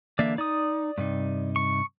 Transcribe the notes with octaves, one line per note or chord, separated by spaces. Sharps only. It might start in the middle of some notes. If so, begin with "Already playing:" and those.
D3 E3 A#3 D5 E5
D#4 D5 D#6
G2 C3 D#4
C#6